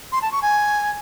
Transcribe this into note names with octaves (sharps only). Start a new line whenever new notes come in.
C6
A5
C#6
G#5